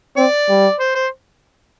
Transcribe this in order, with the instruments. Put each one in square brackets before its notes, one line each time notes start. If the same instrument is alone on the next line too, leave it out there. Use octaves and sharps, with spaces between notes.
[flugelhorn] C4 [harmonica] D5
[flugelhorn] G3
[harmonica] C5
C5